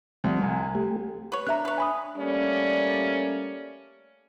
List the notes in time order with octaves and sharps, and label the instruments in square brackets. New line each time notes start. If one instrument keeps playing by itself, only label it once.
[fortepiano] D2 [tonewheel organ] F3 G3 C4
[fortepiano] C2 [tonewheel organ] G#5
[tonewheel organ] A3 G4
[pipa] B4 C#5
[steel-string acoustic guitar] D4 E5 [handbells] A#5 F#6
[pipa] B4 C#5
[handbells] G#5 B5 D#6
[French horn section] G3 A3 A#3 C#4 D5